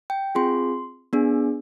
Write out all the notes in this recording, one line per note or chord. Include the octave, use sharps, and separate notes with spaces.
G5
C4 F4 G#4 C6
B3 D4 G#4